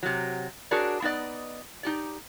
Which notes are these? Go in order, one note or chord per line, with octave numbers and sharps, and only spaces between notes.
C3 F#3
D4 F#4 G#4 A#4 C#5 D5
B3 D#4 B4 D5 D#5
D#4 G4 D5